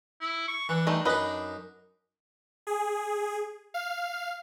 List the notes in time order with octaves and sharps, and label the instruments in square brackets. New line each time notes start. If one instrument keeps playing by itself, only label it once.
[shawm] E4
C#6
[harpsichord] E3 [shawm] D4
[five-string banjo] G3 A3 D#4
[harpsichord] F#2 D#4 [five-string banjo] B4 D#5 B5
[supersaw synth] G#4
F5